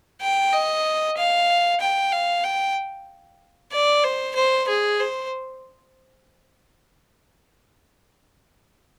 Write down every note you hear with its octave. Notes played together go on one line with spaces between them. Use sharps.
G5
D#5
F5
G5
F5
G5
D5
C5
C5
G#4
C5